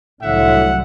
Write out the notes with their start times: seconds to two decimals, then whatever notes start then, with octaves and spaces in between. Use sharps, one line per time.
0.22 C2 A2 D3 F#3 E5 F#5